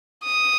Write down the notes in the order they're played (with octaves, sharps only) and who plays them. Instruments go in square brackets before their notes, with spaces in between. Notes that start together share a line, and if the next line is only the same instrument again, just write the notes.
[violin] D#6